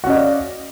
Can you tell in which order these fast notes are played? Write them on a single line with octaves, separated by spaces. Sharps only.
F#4 C#4 D#5 F5 D5